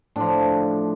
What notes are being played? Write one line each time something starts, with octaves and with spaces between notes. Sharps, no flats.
A2 F3 D4